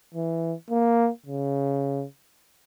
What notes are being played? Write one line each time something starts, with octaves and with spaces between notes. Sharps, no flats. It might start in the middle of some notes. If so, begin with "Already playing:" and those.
E3
A#3
C#3